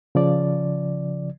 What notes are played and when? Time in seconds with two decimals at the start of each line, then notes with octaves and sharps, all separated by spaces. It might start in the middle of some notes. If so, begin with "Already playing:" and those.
0.15 C#3 F3 D5